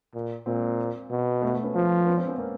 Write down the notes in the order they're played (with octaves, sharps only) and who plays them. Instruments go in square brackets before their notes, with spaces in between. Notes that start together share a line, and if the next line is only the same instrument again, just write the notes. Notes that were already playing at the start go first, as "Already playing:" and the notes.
[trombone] A#2
[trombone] A#2 [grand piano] A#3 C4
[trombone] B2
[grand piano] A3 B3
A3 B3
B3 C#4
[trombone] F3
[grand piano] B3 C#4
C4 D4
B3 C#4
A#3 C4